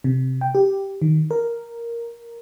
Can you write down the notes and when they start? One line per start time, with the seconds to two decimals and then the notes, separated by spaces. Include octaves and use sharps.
0.04 C3
0.41 G5
0.55 G4
1.02 D#3
1.31 A#4